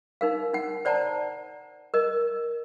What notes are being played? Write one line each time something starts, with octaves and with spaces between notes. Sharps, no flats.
D#4 A#4 F5
D#4 F#5
C5 D5 F#5 A5 A#5
A#4 D#5